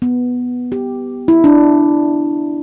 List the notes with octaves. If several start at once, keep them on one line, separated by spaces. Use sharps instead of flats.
B3
G4
E4
D4